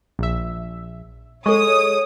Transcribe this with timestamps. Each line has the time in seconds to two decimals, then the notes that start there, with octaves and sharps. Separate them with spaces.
0.19 A#1 E5
1.46 G#3 A4 C#5 C#6 D#6